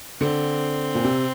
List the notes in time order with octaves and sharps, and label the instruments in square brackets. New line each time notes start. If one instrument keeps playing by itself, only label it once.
[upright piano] D3 [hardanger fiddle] C4
[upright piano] A#2
C3